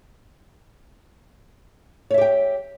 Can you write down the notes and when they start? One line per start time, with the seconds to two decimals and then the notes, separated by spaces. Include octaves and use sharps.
2.10 C#5
2.14 E5
2.18 G4
2.21 G5